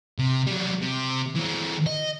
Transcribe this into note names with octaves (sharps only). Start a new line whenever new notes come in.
C3
F#3 G3
C3
E3 C4
D#5